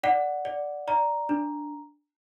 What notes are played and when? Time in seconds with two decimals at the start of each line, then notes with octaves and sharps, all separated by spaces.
0.03 D5 F#5
0.45 D5
0.88 D5 A#5
1.29 D4